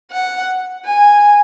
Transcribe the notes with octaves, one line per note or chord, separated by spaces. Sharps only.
F#5
G#5